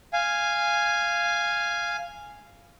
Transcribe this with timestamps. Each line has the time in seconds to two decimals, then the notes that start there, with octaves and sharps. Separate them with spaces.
0.13 F5 G#5